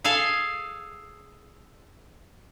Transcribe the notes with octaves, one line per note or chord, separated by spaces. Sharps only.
G#4 A4 F5 G#5